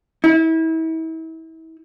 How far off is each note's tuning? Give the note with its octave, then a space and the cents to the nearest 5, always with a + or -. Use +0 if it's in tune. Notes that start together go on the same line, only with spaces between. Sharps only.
E4 -35